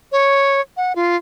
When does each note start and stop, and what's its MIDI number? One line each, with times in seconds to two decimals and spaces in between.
0.12 0.61 73
0.77 0.93 78
0.96 1.16 65